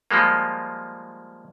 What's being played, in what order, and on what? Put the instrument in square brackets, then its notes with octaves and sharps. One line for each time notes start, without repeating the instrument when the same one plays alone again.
[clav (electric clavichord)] F3 G3 G#3 A#3